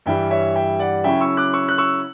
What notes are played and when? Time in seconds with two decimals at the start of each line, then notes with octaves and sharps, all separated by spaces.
0.06 G2 E3 G3 E5 G5
0.31 C#5 E5
0.56 E5 G5
0.79 D5 F#5
1.04 C#3 F#3 C#4 E4 E5 G5
1.21 C#6 E6
1.37 D6 F#6
1.54 C#6 E6
1.69 F#6
1.78 C#6 E6